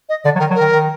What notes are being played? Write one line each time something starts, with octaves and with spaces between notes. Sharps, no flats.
D#5
D3 D5
F#3
D#3 A#4
F#3
A#4
D#3
D#3